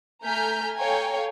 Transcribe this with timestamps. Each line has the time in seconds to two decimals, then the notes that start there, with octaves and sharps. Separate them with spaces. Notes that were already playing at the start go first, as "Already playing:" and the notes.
0.24 A3 G#5 A#5 F6 G6 B6
0.78 A4 C#5 F5 G5 G#5 A#5